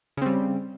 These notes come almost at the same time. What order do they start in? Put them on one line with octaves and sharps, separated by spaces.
C#3 C4 G3